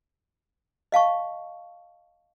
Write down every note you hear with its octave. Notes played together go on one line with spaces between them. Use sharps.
D#5 F5 A5 C#6